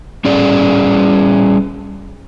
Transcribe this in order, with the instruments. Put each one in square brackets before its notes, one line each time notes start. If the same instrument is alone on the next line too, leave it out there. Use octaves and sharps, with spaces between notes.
[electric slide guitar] G3 C#4 G#4 D5